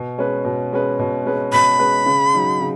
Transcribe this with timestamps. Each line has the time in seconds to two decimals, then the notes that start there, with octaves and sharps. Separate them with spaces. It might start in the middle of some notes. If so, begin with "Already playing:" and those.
Already playing: B2
0.18 G#3 C#4 B4
0.45 B2
0.72 G#3 C#4 B4
0.99 B2
1.26 G#3 C#4 B4
1.53 B2 B5
1.79 G#3 C#4 B4
2.06 C#3
2.34 F#3 D#4
2.61 C#3